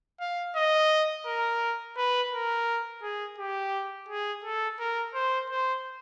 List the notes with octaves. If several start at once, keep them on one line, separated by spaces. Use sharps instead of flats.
F5
D#5
A#4
B4
A#4
G#4
G4
G#4
A4
A#4
C5
C5